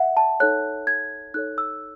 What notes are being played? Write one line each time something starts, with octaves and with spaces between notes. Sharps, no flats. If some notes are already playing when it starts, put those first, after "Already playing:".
Already playing: E5 F#5
A5
D#4 A4 C#5 F#6
G#6
D#4 A4 C#5 F#6
E6